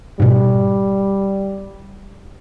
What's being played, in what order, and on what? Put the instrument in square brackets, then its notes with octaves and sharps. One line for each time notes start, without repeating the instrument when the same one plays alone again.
[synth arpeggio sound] G#2 B2 [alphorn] G3